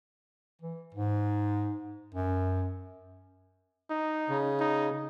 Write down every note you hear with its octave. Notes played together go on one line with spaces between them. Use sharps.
E3
G#2
F#2
D#4
C#3
D#4